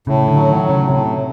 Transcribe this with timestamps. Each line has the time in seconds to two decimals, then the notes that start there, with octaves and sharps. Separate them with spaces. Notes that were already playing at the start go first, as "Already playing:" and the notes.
0.07 A2 C#3
0.28 D3
0.35 F#3
0.49 D#3
0.62 A2
0.69 C#3
0.90 A2 C3